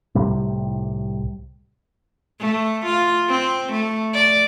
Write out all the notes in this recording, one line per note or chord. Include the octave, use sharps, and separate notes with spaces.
C2 A2 C3 G3
A3
F4
C4
A3
D5